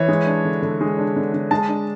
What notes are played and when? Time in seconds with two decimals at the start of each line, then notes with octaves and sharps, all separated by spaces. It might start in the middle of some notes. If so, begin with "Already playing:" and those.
Already playing: E3 C#5
0.08 G#3
0.27 D4
0.44 D3
0.62 D3
0.81 G#3
0.98 D4
1.16 D3
1.33 D3
1.51 G#3 A5
1.69 D4